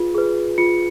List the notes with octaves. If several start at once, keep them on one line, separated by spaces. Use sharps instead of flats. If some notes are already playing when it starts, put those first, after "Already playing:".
Already playing: F4 G#4 B4
G#4 B4
F4 C#7